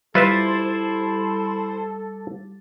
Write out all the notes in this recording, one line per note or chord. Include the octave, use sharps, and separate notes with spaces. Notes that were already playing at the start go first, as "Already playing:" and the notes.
G3 E4 F4 A4 B4 C5 E5 A6